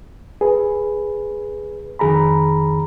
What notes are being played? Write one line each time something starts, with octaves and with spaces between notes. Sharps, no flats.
G#4 B4
F2 D#3 G#4 A#5 B5